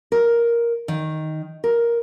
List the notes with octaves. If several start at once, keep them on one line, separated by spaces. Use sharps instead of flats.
A#4
D#3
A#4